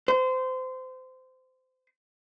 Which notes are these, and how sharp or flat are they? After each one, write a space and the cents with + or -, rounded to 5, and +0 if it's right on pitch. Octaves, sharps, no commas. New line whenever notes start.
C5 -25